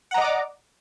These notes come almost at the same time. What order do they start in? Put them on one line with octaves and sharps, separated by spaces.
F#5 A#5 D#5 D6 D5